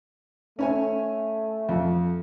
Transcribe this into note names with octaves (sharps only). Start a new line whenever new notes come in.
A3 C#4 C#5 G#5
F2